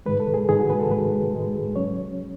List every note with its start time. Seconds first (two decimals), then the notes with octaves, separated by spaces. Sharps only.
0.06 G#2 D#3 G#3 B4
0.20 A4
0.34 G#4
0.48 G#2 D#3 G#3 G#4
0.59 F#4
0.70 B4
0.79 A4
0.91 G#2 D#3 G#3 B4
1.32 G#2 D#3 G#3
1.76 F#3 C#4 C#5